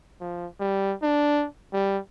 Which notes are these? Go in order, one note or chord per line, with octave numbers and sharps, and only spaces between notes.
F3
G3
D4
G3